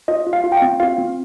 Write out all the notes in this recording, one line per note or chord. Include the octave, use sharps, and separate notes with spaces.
F4 D#5
F4
F5
F4
G5
F5
C4
F4 F5
C4